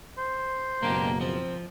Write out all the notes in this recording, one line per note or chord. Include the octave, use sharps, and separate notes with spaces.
C5
F#1 B2 G#3 A#3 D4 G4
F3 C4